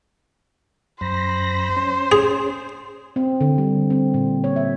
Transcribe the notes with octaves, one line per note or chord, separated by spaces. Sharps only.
F#2 C5 B5 A#6
C#4
G#4
C4
D3
G3
C4
A#2
C#5
E5